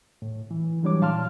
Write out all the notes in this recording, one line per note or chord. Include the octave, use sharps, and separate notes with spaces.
A2
E3
E3 F#3 G3 D4 C#5 D6
A#2 F5 A5 C6 F6